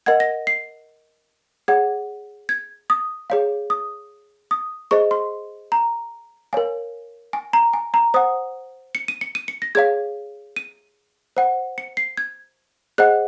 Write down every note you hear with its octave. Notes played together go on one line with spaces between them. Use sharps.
A#4 D#5 F#5 G#6
A#6
C7
G#4 C#5 F#5 G#6
G#6
D#6
G#4 C#5 F5
D#6
D#6
G#4 C5 D#5 C#6
C6
A#5
A#4 C#5 F5 G#5
G#5
A#5
G#5
A#5
C5 F#5 D#6
C#7
D#7
C#7
D#7
C#7
A#6
G#4 C#5 F5 G#6
D#7
C5 F#5
C#7
C7
G#6
G#4 C5 D#5 F#5 F#6